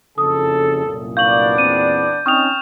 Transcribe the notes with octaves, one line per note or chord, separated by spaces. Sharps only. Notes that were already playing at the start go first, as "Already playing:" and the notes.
F#1 F2 C#3 A4 D#6
C2 F#2 A#2
B3 D4 D5 F5 C#6 G6 F#7
E2 A#2 C4 D#7
C4 C#4 D#4 G5 C#6 D#6 F6 F7